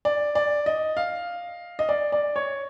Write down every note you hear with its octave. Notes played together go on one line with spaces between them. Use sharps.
D5
D5
D#5
F5
D#5
D5
D5
C#5